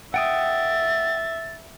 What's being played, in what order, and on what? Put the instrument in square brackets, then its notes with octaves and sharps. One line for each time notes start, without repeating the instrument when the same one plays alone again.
[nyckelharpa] E5 [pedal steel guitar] F#5 G5 D#6 [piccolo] A6